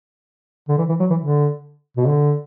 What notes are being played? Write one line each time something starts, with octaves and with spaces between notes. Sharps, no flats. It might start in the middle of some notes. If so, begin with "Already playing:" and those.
D3
E3
E3
F#3
E3
D3
B2
D3